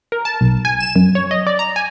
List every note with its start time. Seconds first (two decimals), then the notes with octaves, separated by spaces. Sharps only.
0.12 A#4
0.25 A5
0.41 B1
0.65 G#5
0.81 E7
0.96 F#2
1.15 C#5
1.31 D#5
1.47 D5
1.59 A#5
1.76 G#5